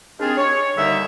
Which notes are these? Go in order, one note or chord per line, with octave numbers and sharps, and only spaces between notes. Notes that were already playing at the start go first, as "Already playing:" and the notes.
D#2 C4 D4 F4 G#4
C#5
D#2 D3 G3 D#4 E5 E6